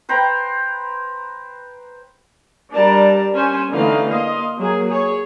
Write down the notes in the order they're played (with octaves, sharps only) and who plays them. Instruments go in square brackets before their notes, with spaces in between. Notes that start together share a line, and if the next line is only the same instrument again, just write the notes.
[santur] B4 C5 G5 A#5
[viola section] G3 D4 A#4 D5 A5 A#5
C#4 C5 G#5
D3 E3 A3 D#4 F5
A#3 D#5 F5 C6
F#3 A#3 G#4
G#4 C#5